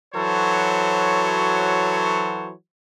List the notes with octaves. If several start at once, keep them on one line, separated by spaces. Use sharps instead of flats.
E3 F#3 F#4 A4 C5 C#5